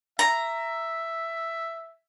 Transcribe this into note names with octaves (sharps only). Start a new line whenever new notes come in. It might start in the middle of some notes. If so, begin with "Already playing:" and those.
E5 A#5